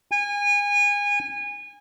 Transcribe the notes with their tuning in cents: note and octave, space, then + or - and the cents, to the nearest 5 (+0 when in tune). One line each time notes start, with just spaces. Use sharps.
G#5 -25